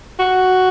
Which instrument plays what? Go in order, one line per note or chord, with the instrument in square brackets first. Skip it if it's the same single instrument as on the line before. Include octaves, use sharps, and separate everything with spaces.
[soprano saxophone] F#4